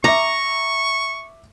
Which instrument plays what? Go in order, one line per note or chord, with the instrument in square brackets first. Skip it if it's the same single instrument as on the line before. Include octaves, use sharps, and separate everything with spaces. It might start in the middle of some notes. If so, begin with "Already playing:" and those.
[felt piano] E5 D6 [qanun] A#5 [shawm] C#6